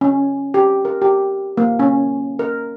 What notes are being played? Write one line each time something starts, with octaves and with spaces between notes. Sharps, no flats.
C#4
G4
A#4
G4
A#3
C#4
A#4